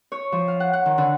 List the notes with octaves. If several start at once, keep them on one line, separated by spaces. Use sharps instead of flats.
C#5
F3
F5
F#5
F#5
D#3
D3